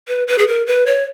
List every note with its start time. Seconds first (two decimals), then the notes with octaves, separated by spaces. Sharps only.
0.08 B4
0.28 B4
0.38 G#4
0.48 A#4
0.67 B4
0.86 C#5